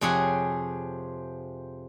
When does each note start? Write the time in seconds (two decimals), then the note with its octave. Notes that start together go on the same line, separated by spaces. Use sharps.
0.01 F2 C3 C4 G#4 C#5 F#5